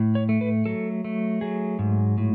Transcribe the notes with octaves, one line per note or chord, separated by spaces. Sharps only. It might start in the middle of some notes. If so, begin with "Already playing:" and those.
Already playing: A2
C#5
A3
B4
F#3 A4
A3
F#3 G#4
G#2
A2